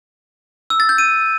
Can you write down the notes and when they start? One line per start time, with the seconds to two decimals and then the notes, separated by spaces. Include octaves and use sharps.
0.70 E6
0.80 A6
0.89 G6
0.98 D#7